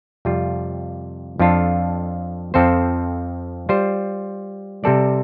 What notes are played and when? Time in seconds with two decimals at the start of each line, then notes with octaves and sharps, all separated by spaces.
0.25 F2 C3 G3 F4
1.39 F2 F3 D4 F4 A4
2.54 F2 F3 C4 A4 C5
3.69 G3 F4 C5
4.84 C3 G3 C4 A4 D5